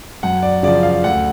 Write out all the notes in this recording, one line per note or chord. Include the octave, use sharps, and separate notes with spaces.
F#2 F#5
D5
C#3 F3 D5
F5
D2 F#5